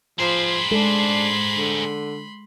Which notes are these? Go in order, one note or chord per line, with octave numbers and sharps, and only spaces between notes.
F3 G#4 C5 B5 C6
G#3 D4 A4
D3